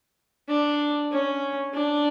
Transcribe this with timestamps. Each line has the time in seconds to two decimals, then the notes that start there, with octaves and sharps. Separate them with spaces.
0.48 D4
1.11 C#4
1.74 D4